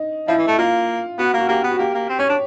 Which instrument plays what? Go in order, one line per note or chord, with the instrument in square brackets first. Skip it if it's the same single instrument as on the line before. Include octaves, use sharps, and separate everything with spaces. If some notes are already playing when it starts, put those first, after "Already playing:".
Already playing: [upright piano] D#4
[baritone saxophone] F3 [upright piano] E4
[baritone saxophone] E3
A3
[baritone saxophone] A#3 [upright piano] F4
[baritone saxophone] B3 [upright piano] F#4
[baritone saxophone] A#3 [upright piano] F#4
[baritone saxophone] A#3 [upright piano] G4
[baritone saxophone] B3
[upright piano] F#4
[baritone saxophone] A#3 [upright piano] G4
[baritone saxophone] A#3
C4
[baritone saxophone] C#4 [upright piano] C#5
[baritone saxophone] D4